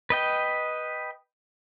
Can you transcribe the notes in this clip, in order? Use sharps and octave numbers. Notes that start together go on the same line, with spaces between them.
B4 D#5 G5